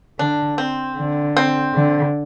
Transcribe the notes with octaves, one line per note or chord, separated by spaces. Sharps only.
D3 D4
C4
D3
C4
D3